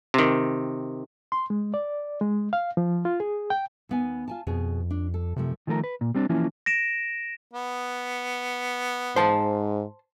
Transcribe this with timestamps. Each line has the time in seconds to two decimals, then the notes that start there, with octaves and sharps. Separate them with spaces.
0.14 C3 D#3
1.32 C6
1.50 G#3
1.74 D5
2.21 G#3
2.53 F5
2.77 F3
3.05 F4
3.20 G#4
3.50 G5
3.89 D#2 B3 G#5
4.28 F4 G#5 A5
4.47 F2 B2 G#4
4.90 D4
5.14 A4
5.36 F#2 C3 F3 A3
5.67 D#3 F3 A3 A4 A#4
5.84 B4
6.01 A#2
6.15 G3 C4 D4
6.29 E3 F3 A#3 C#4 E4
6.66 A#6 D7 E7
7.53 B3
9.16 G#2 C5 A5